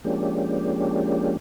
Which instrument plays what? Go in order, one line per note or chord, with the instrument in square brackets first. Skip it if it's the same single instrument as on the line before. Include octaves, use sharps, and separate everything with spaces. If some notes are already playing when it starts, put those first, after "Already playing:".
[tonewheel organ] F3 G#3 A#3 C#4 D4 G4